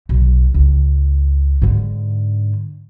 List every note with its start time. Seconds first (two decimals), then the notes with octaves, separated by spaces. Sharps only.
0.09 B1
0.54 C#2
1.62 G#2 D3